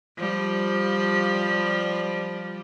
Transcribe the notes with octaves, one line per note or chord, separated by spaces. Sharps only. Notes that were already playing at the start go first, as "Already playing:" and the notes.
F3 G3